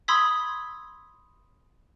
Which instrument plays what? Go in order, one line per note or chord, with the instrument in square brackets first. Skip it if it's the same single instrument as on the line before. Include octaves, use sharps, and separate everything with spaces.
[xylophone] B5 C6 D#6 E6 G#6 B6